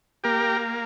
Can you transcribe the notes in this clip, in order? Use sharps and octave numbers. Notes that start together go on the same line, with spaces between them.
A#3 G4 A#4